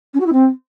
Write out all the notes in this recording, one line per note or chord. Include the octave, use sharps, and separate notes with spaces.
C#4
F#4
E4
C4